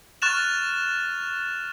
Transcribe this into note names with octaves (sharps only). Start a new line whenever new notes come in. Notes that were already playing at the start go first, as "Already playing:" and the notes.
C#6 F6 F#6 A6 E7 F7